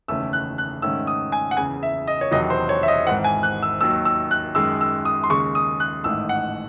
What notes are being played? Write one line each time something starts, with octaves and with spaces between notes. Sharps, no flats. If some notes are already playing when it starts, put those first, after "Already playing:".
F#1 E2 D#3 A3 C#4 E6
F#6
F#6
G#2 D#3 A3 C#4 E6
D#6
G#5
F#5
F#1 E2 C#3 G#5
E5
D#5
C#5
E1 E2 C3 D#3 F#3 D#5
C5
C#5
E5
D#5
G#1 G#2 E3 C4 F#5
G#5
F#6
E6
D#2 D#3 F#3 E6
E6
F#6
F#2 D#3 G#3 E6
E6
D#6
C6
D#2 C#3 G#3 C#6
D#6
F#6
A1 G#2 D#3 A3 E6
F#5